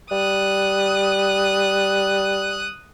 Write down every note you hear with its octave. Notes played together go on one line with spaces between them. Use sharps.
G3 D#6 F#6